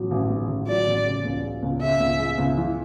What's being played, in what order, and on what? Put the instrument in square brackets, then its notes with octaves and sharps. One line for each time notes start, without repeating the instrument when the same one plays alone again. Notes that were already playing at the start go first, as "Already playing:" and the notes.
Already playing: [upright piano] A1 F#3
A1
G#2
A1
[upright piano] F#3 [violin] D5
[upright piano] A1
C#3
C#2
G#3
C#2
[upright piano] C#3 [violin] E5
[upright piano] C#2
G#3
C#2
E3